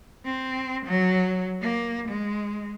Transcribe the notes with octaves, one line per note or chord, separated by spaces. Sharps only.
C4
F#3
A#3
G#3